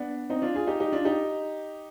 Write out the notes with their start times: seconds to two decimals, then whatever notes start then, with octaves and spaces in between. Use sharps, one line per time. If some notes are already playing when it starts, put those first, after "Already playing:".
Already playing: B3 D4
0.30 C4 D#4
0.42 D4 F4
0.54 F4 G#4
0.67 D#4 G4
0.80 D#4 G4
0.92 D4 F4
1.05 D#4 G4